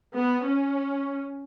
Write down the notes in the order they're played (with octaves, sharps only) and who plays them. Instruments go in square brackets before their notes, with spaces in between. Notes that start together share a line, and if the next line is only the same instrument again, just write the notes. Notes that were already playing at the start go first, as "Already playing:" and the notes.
[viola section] B3
C#4